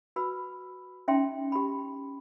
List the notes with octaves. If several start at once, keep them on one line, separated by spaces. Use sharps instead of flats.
F#4 B4 B5 E6
C#4 D#4 E5 G5 A5 C6
G4 B5